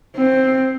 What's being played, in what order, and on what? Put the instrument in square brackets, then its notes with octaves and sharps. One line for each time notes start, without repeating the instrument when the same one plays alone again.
[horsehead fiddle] C4